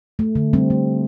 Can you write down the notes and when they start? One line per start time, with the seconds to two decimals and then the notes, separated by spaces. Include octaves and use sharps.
0.19 A3
0.35 D3
0.53 G3 C4
0.70 A3